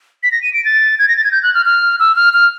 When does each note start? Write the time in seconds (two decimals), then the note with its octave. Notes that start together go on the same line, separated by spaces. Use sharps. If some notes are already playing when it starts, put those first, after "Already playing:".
0.23 B6
0.32 A#6
0.42 D#7
0.53 D7
0.65 A6
0.99 G#6
1.08 A#6
1.17 A6
1.24 G#6
1.32 G6
1.43 F#6
1.55 F6
1.66 F6
2.00 E6
2.16 F6
2.33 F6